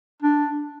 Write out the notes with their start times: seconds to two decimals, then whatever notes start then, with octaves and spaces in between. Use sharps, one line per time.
0.23 D4